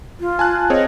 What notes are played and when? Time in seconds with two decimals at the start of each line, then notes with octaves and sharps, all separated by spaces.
0.20 F4
0.39 G#5 A5 F#6
0.70 C4 G#4 C#5 D#5